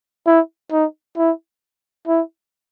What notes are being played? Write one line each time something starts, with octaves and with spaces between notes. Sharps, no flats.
E4
D#4
E4
E4